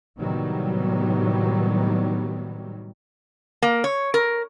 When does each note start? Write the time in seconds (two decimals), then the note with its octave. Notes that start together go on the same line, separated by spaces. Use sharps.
0.17 A2 C3 D#3 F#3 G3 B3
3.63 A#3
3.84 C#5
4.14 A#4